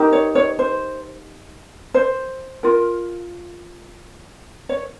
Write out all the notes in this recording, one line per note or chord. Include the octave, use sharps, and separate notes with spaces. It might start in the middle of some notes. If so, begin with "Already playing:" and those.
Already playing: D#4 G4 A#4
C#5
C#5
C5
C5
F4 A#4
C#5